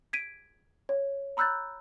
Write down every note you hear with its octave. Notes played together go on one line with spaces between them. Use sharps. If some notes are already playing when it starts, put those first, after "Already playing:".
G#6 B6 D7 D#7
C#5
A#5 B5 E6 F#6 G6 A6